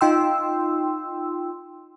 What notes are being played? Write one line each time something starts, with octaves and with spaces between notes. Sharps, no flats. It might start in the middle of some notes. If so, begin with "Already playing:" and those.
D#4 F4 G5 C6 E6